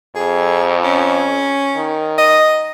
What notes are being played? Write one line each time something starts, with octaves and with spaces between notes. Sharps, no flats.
F2 G#4
C#4
D#3
D#5